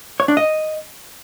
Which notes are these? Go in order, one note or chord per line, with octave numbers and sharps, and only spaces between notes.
C#5
D4
D#5